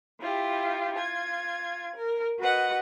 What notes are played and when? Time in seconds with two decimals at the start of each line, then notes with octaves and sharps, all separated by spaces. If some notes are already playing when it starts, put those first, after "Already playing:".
0.20 E4 F4 G4
0.94 F4 G#6
1.94 A#4
2.40 F#4 B4 D#5 F#5